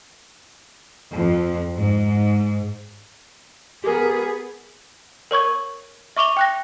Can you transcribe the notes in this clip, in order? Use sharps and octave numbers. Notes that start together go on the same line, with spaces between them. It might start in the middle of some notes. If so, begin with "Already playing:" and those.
F2
G#2
B3 G4 G#4 A#4
A#4 C#5 C#6 G#6
E5 C#6 D6 F7 G7
G5 F#6 A#6